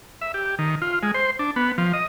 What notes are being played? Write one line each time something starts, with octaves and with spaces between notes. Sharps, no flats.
E5
G4
D#3
F4
G#3
C5
D4
B3
F3
D#5